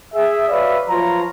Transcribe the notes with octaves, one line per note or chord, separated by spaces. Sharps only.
G#4 E5
F#4 B4 C#5 D5 E5 F5
F3 F#3 F4 B4 C#5 A#5